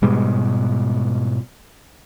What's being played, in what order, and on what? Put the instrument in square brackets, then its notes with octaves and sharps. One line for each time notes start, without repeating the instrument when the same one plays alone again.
[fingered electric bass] G#2 B2 G3 G#3